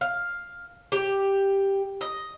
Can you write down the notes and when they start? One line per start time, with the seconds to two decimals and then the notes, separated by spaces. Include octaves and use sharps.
0.01 F5
0.92 G4
2.01 D#5